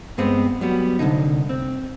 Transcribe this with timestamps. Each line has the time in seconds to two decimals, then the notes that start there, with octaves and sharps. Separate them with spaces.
0.18 G2 G#3 B3 C4
0.61 F#3 G3 B3
0.99 C2 F2 D3 D#4
1.49 C4